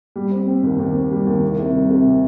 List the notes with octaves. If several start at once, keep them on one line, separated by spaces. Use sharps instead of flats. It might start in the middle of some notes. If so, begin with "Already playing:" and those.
G3
C4
C4
D#2
D#2
C4
G3
D#2
C2
C3
G3
C3